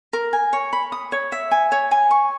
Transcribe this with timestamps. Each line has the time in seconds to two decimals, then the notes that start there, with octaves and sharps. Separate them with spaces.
0.13 A#4
0.33 G#5
0.53 C#5
0.73 B5
0.92 D#6
1.12 C#5
1.32 E5
1.51 G#5
1.72 C#5
1.91 G#5
2.11 C#6